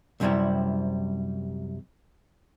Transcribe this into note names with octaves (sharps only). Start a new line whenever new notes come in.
C2 F#2 C3 G3 C4 E4